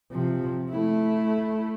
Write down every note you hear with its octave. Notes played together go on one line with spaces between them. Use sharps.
C3 F3
A3 E4